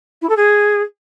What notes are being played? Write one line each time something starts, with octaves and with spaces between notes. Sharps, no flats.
E4
A4
G#4